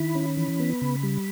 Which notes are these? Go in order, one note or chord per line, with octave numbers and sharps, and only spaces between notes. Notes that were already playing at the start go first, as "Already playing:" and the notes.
Already playing: D#3 E4 B5
C#4
E3
B3
C#3
G3